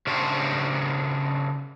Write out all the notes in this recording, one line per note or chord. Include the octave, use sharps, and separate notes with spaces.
C#3 C#4 D4 F#4 G4 C5